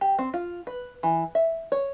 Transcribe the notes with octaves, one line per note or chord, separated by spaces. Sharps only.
G4
C4
F4
B4
E3
E5
C#5